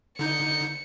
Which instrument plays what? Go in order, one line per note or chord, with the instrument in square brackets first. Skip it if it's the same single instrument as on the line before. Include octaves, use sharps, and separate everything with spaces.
[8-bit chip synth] D3 D#4 G6 [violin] C#7